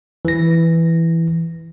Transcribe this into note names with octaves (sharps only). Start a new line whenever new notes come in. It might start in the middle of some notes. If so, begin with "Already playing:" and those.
E3 A#6